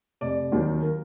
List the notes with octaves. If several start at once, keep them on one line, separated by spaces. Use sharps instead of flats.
F1 D5
D#2 D#3 F#3
A#4